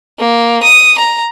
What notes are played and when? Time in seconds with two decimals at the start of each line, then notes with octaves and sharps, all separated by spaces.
0.19 A#3
0.63 D#6
0.98 A#5